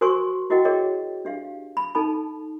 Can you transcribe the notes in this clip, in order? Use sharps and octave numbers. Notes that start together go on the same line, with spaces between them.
F#4 A#4 C5 G#5 C6 C#6
E4 F#4 A#4 D#5 F#5 G5
G#4 A#4 C#5 D#5 G5
D4 G4 F5
B5
D#4 A4 G#5 A5 B5